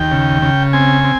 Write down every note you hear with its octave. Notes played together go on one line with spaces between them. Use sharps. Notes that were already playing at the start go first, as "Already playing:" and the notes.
Already playing: D#2 G5
C#3
C#3
C4 G#5
C4